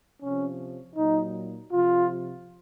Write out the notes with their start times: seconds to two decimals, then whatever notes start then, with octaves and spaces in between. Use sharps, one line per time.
0.20 C3 F3 C#4
0.96 A#2 F#3 D#4
1.72 C3 F3 F4